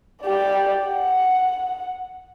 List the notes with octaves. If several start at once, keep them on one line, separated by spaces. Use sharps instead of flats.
G4 D5
F#5